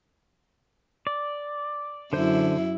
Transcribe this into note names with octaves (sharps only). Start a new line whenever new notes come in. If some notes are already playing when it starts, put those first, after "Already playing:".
D5
F#2 D3 E4 C5